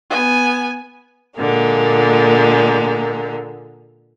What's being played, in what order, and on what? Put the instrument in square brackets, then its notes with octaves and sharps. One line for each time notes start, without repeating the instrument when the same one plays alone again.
[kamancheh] B3 G#5
[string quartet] A#2 D3 G#3 A#3